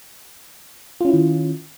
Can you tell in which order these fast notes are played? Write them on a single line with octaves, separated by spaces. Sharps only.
F4 C#4 E4 D#3